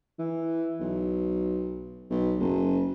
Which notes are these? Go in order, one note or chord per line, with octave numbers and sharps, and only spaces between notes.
E3
B1
B1
F#1